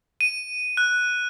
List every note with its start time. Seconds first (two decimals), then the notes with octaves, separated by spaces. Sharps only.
0.21 D#7
0.77 F#6